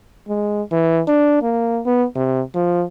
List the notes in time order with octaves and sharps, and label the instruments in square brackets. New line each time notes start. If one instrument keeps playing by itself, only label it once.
[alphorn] G#3
E3
D4
A#3
B3
C3
F3